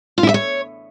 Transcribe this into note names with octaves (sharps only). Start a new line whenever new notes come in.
F4
E4
E5
C#5